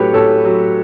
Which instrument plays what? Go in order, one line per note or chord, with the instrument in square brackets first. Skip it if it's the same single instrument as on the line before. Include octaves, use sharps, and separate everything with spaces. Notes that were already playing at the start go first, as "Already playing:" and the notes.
Already playing: [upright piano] A2 F#3 G4 A4 B4 C#5
A2 A4 C#5
F#3